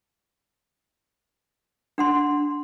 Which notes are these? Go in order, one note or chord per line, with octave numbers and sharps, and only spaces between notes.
D4 F#5 C6